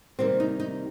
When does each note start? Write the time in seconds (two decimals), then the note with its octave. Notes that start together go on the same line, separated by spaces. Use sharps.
0.19 C3 D#3 G3 A#3 C4
0.40 D#4
0.60 D#4